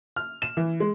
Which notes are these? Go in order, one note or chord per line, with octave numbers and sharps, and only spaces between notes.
F6
E7
E3
G#3